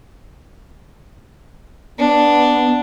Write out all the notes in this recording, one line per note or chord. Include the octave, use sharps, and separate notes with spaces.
B3 D4